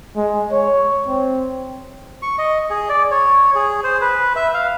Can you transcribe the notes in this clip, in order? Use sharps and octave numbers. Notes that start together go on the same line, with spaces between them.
G#3
C#5
C4
C#6
D#5
G#4
D5
C#5
G#4
C5
B4
E5
F5